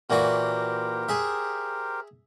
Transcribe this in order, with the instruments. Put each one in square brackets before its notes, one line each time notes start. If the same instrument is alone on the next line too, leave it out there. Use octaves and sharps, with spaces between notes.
[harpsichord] A#2 E3 F#4 [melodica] G4 A#4 C5
[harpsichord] G#4 E5